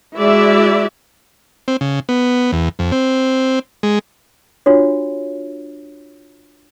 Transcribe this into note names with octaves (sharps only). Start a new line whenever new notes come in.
G#3 E4 F#4 D5 E5
C4
C#3
B3
E2
F2
C4
G#3
D4 F4 F#4 C#5